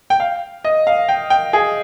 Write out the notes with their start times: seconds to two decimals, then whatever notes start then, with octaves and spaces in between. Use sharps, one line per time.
0.10 G5
0.20 F5
0.64 D#5
0.87 F5
1.09 G5
1.30 G5
1.53 G#4